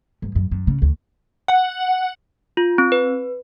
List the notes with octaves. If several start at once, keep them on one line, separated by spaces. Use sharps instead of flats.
G2
F#2
F#2
C#3
D2
F#5
F4
C4
B4